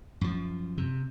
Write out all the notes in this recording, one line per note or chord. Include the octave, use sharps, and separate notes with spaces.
F#2 F3
C3